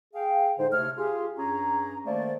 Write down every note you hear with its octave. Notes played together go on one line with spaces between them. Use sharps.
G#4 F5 G5
A2 D3 G#3 D#4 C5
C3 A3 C#5 F6
F4 G4 G#4
G2 C#4 G#4 A#5
D#3 A3 A#3 C5 D5